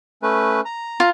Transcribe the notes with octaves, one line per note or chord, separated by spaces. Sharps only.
A3 C#4 B4
A#5
F4